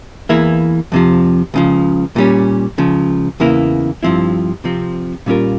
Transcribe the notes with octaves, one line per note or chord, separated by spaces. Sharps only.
E2 E3 A#3 E4 G#4
F2 C3 F3
C#2 C#3 F3
A#2 G3 C#4
C#2 C#3 F3
E2 C#3 E3 A#3 E4
G2 F3 C4 E4
C3 F3 C4
A#2 G3 C#4 F4 A#4